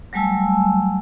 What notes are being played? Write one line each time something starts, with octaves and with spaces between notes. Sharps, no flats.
F#3 G3 A3 G#5 A5 E6